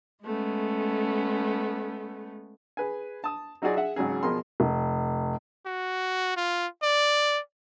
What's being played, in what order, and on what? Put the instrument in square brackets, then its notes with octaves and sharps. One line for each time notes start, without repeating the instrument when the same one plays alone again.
[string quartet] G#3 A3 B3 C#4
[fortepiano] G#4 B4 G#5
A5 D#6
F#3 D#4 F4 F#4 G#4 D5
G#4 E5 F#5
G#1 C#3 F#3 G#4
B2 F3 G#4 A#4 B5 C6
[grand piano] F1
[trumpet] F#4
F4
D5